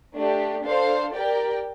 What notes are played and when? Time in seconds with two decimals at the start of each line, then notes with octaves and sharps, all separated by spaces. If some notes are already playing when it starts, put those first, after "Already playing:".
0.14 A3 D4 G4
0.63 D4 A4 C5 F5
1.14 G4 A#4 D5 G5